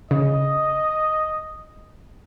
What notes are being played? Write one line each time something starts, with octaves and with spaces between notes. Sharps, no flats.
C#3 D#5